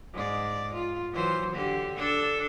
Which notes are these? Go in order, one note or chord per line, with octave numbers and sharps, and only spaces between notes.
G#2 D5
F4
E3 F#3 C5
D3 G4
D4 A4